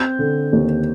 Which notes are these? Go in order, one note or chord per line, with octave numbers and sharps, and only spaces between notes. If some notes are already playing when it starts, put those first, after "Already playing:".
Already playing: C4 G6
D3
D#2